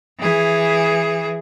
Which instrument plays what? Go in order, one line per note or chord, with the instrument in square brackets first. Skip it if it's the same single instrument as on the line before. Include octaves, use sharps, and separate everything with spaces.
[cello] E3 G#4